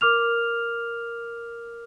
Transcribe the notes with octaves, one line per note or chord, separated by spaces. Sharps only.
A#4 D6 F6 F7